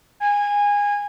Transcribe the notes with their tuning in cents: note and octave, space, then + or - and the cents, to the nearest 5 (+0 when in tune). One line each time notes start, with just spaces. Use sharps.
G#5 -20